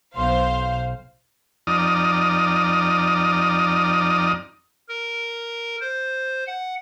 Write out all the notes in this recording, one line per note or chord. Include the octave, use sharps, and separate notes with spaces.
B1 C5 F5 C6
F2 D#4 D5 D#6 F6
A#4
C5
F#5